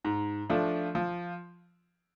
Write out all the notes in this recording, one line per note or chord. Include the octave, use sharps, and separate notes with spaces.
G#2
F3 A3 D4
F3